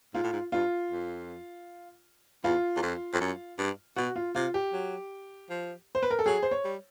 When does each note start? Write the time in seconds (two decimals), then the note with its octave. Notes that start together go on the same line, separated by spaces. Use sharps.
0.14 G#2 F4
0.24 A2
0.33 G#2
0.52 G2 F4
0.91 F2
2.44 E2 F4
2.76 E2
2.82 F2
3.13 F2
3.20 F#2
3.59 G2
3.96 B2 F#4
4.16 F4
4.35 C3 F4
4.54 G4
4.73 F#3
5.50 F3
5.95 C5
6.03 B4
6.10 A#4
6.19 A4
6.26 F#3 G#4
6.43 C5
6.51 C#5
6.65 G3